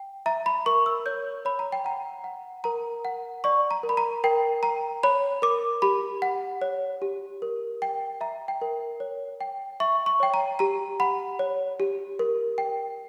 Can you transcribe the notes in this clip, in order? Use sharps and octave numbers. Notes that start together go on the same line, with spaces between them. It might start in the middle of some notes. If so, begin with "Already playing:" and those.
Already playing: G5
E5 A#5
B5
A#4 C#6
E6
C#5 G6
C#5 B5
A#5
G5
F#5 A#5
F#5
A#4 A#5
F#5
D5 C#6
A#5
A#4
B5
A#5
A#4 G5
G5 A#5
C#5 B5
A#4 D6
G4 B5
F#5
C#5
G4
A#4
G5
E5 A#5
G5
A#4
C#5
G5
E5 C#6
C#6
C#5 G5
A#5
G4 A#5
F#5 B5
C#5
G4
A#4
G5